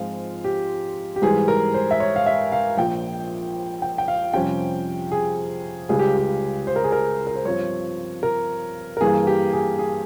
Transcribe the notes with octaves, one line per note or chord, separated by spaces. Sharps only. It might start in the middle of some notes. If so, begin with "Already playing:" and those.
Already playing: G#2 F3 G#3 C4 F4 F5
G4
G4
G#2 E3 G3 G#4
A#4
C5
E5
C#5
F5
E5
F5
A#1 A#2 F3 G5
G5
G5
F5
F2 C3 G3 C#4 F4 G5
G#4
C#2 C#3 G3 G#4
G4
G4
C5
A#4
G#4
A#4
A#4
C5
G2 F3 C4 C#5
A#4
A#4
G2 E3 A#3 G#4
G4
G#4
G#4